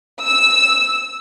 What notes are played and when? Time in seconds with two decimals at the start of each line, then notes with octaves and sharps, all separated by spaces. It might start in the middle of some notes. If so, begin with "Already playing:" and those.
0.24 E6